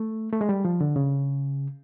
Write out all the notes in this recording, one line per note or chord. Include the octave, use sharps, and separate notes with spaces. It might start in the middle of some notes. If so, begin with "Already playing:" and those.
Already playing: A3
A3
G#3
G3
F3
D3
C#3